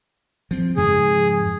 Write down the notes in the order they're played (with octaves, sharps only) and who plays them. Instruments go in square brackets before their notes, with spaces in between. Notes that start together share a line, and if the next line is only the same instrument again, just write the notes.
[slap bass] F3 C4
[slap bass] F2 G#2 C#3 [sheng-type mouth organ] G#4